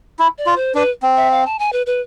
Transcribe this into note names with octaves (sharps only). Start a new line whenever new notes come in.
E4
D5
F4
C5
D4 B4
C4
E5
F5
A5
G#5
B4
B4